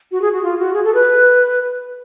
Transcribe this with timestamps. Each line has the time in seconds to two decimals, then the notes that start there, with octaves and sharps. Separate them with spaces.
0.12 F#4
0.22 G#4
0.32 F#4
0.43 F4
0.59 F#4
0.73 G#4
0.84 A4
0.95 B4